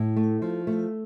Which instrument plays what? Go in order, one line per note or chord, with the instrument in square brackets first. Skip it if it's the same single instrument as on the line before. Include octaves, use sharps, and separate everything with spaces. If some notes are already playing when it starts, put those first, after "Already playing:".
Already playing: [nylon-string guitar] A2
A3
F3
A3